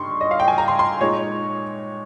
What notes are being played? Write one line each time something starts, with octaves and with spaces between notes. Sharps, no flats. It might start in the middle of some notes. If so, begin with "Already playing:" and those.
Already playing: G2 D#4 C6 C#6
D#5
F5
G5
G#5
A#5
C6
C6
A#2 G#3 D#4 C#5